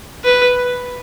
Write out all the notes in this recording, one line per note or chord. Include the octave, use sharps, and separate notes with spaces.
B4